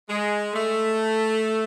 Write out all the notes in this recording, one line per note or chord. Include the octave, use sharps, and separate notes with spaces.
G#3
A3